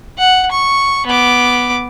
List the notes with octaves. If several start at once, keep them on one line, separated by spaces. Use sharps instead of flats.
F#5
C#6
B3 D6